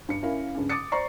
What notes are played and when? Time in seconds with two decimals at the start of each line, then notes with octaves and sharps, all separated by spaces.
0.09 G2 C#7
0.22 C#4 E4 A#4 F5
0.55 G2 C#3
0.69 D6 D#6 A6 C#7
0.92 C5 D5 A#5 C#6 C7